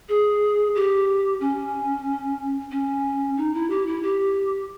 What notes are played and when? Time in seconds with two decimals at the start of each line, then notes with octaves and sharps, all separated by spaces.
0.09 G#4
0.75 G4
1.40 C#4
2.71 C#4
3.37 D#4
3.54 E4
3.70 G4
3.86 E4
4.03 G4